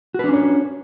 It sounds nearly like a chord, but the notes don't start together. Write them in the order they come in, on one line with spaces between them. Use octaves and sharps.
F#4 B4 D4 C#4 C#5